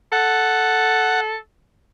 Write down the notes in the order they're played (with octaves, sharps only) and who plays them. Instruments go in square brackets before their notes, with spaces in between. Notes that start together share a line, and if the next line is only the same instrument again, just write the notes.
[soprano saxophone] A4 [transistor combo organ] F#5